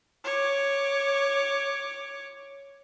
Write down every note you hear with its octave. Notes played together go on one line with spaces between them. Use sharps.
C#5 D6